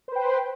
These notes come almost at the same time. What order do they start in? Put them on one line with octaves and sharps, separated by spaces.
C5 B4 G5